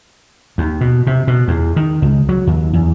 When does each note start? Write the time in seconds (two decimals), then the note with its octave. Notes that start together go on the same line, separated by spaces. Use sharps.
0.58 D#2
0.81 B2
1.07 C3
1.27 B2
1.48 E2
1.76 D#3
2.02 C#2
2.29 F#3
2.47 D#2
2.73 E2